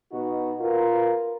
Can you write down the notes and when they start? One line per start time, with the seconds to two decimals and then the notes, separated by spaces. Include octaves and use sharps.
0.12 B2 D#4 F#4
0.60 F4 A#4 B4